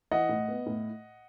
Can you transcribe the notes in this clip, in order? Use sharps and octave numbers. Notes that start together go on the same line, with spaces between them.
E3 D#5 F#5
A2
B3
A2